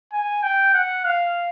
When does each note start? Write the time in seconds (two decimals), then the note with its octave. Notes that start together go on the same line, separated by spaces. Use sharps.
0.13 G#5
0.43 G5
0.74 F#5
1.05 F5